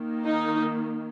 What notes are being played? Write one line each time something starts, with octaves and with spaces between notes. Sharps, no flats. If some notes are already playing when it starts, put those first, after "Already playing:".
Already playing: D#3 A#3
D#4